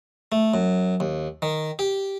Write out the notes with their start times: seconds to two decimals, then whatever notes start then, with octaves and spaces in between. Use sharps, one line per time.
0.32 A3
0.54 F#2
1.00 D#2
1.42 D#3
1.79 G4